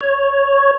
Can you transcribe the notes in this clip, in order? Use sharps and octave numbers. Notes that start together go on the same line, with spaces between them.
C#5